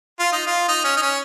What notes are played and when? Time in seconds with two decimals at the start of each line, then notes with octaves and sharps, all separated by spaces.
0.20 F4
0.32 D#4
0.47 F4
0.68 D#4
0.84 C#4
0.97 D#4
1.02 C#4